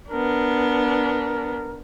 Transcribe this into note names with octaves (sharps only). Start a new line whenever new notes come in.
B3 D4 A#4